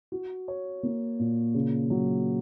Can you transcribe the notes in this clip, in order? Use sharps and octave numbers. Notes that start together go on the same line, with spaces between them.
F#4
C#5
A#3
A#2
C#3
F#3